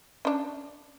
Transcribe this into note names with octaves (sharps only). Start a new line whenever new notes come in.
C#4 D4